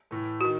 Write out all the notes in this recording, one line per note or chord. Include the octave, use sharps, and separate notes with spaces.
A2 E3 A3
D#3 F#4